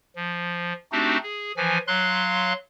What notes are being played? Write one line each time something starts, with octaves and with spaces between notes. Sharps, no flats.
F3
A3 C4 D4 D#4 F#4 G4
G#4
E3 F3 G#5
F#3 F5 C6 F#6